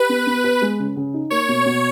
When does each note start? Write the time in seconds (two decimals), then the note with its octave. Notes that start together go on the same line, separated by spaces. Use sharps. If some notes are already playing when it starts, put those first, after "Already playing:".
Already playing: G4 B4
0.09 B3
0.27 B3
0.44 B4
0.62 G#3
0.79 C#3
0.96 C#3
1.14 D#4
1.30 A#3 C#5
1.48 B2
1.66 B2